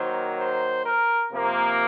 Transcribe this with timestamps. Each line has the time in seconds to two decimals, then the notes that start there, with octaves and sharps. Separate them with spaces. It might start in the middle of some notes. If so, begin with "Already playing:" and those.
Already playing: D#3 F#3 A#3 C5
0.38 C5
0.85 A#4
1.33 C3 F3 A#3